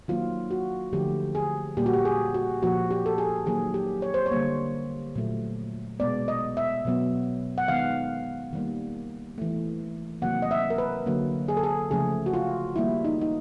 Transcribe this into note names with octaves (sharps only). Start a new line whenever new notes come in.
D#3 F#3 A#3 F4
F#4
D3 F3 A3 G4
G#4
A#2 G3 A#3 G4
F#4
G4
G#4
F#4
A#2 F3 A#3 F#4
G4
A4
G#4
D#3 F#3 A#3 G#4
G4
C#5
C5
C#5
D3 G3 A#3
A#2 F#3 A3
B2 G#3 B3 D5
D#5
E5
B2 F#3 B3
F#5
D#3 G#3 B3 F5
D#3 G3 A#3
E3 A3
C3 D#3 F#3 A#3 F#5
D#5
E5
A#4
B4
D3 F#3 A#3
G#4
A4
G#4
C#3 F3 A3 G#4
F#4
F4
D#3 G3 A#3 E4
D#4
D#4